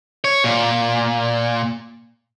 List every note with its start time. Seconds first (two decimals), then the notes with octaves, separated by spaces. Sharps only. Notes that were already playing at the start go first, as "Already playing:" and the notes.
0.24 C#5
0.44 A#2